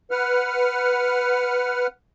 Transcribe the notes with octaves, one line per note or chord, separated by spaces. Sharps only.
B4 F#5 F6